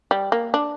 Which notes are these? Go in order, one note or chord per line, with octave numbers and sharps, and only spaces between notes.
G3
A#3
D4